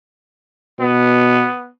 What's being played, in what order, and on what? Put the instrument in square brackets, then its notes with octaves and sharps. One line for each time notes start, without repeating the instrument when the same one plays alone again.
[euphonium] B2 [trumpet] B3